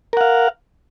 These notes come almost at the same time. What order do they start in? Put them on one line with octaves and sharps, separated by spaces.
A#4 F#5 F5